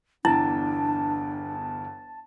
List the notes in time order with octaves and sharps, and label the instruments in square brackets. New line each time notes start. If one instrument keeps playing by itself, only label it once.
[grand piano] G1 E2 G5 [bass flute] D4 [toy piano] E4 [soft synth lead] A5